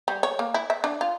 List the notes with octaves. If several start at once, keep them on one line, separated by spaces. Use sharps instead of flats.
G3
C#5
A#3
E4
E5
D4
F4